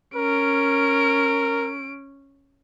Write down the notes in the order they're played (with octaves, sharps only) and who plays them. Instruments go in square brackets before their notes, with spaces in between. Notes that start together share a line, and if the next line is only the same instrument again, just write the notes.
[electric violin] C#4 D7 [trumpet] A#4